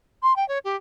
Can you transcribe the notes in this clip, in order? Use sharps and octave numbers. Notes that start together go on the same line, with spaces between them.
C6
G5
C#5
G4